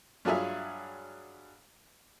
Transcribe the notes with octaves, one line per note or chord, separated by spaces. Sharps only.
G2 F#3 F4 G#4 E5 G#5